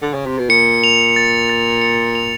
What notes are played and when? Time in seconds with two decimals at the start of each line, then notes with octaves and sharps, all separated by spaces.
0.02 D3
0.14 C#3
0.26 C3
0.38 B2
0.50 A#2 C#7
0.84 F7
1.16 A6
1.49 A6
1.82 C#7
2.15 F7